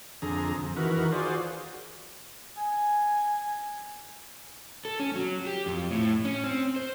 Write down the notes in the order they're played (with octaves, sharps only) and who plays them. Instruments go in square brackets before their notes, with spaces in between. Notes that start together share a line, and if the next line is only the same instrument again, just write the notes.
[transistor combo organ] F2 D3 G#4 A#5
F2
D#3 E3 F#4 A#4 B4
F4 F#4 G#4 C5 D5
[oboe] G#5
[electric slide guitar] A4
C#4
F#3
G4
F2
A2
C#4
C4
C5